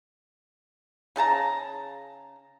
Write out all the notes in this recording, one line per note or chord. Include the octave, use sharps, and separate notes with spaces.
C#3 G#4 A5 A#5